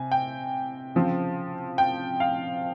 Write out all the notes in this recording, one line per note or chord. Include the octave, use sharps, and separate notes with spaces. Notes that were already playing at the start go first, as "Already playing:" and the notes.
Already playing: C3 G#5
G5
C#3 F3 C4
G5
F5